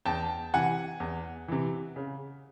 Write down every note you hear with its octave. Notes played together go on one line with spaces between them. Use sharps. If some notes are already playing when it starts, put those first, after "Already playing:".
E2 G5 A5
C3 E3 F#5 G#5
E2
C3 E3
C#3